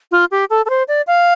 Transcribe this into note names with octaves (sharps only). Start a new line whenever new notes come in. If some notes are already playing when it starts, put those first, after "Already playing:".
F4
G4
A4
A4
C5
D5
F5